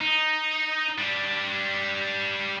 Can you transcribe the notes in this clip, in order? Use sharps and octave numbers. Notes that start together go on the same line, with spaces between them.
D#4
G3 D4